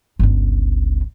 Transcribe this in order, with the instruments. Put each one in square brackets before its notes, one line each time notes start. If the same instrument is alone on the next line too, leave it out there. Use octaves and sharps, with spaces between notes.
[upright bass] G1 C#2